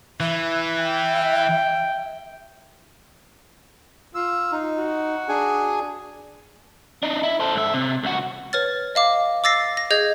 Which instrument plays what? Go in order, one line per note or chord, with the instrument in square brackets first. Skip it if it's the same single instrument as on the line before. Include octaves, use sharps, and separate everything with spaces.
[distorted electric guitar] E3 [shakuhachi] E5
[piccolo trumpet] G5
[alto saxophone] F4 [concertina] E6
[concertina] D#4
[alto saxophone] F#4
[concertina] D4 G#4 G#5
[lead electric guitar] D4 D#4
E4
A4 C5
G#2 E5
C3
C#2 F#4
[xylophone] B4 C#5 F6 A6
D#5 F5 D6
D6 E6 A6 A#6 C7
A#6
G#4 D#5 G6 G#6